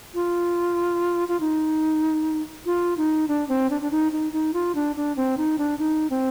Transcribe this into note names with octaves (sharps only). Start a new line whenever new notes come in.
F4
F4
D#4
F4
D#4
D4
C4
D4
D4
D#4
D#4
D#4
F4
D4
D4
C4
D#4
D4
D#4
C4